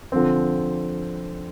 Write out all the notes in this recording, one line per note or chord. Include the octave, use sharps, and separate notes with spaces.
D3 F3 C4